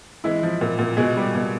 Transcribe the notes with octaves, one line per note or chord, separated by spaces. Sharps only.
E3 G#3 E4
F3
A#2
A#2
B2 G#3 G#4
G3
B2